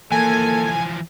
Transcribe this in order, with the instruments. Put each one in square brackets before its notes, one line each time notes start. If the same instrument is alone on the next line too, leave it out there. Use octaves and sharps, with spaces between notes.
[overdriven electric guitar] E3 F3 [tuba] A#3 [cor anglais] A4 [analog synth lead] G#5